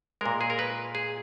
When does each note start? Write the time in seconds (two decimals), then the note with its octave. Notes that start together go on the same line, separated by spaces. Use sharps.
0.21 A#2 G#3 A#4
0.41 G#4
0.50 A#4
0.59 B4
0.95 G#4